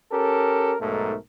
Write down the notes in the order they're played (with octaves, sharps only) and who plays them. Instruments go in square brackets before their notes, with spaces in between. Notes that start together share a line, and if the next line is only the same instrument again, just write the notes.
[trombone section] C#4 G4 A4 A#4
B1 G#2 A3 A4 A#4